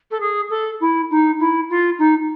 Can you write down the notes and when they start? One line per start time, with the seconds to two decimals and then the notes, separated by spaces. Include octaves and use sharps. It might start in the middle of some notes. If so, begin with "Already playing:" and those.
0.11 A4
0.20 G#4
0.49 A4
0.80 E4
1.10 D#4
1.39 E4
1.69 F4
1.98 D#4